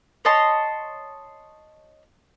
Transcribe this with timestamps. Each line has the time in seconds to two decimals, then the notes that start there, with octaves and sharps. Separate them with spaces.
0.25 C#5 D#5 A5 C6